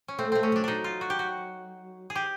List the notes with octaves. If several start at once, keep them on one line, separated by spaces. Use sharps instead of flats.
C#4
A3 C4
A3 C4
C#4
F#3 D4
F#3 D4 D#4
F4
F#4
G4
F#4
G#4
G4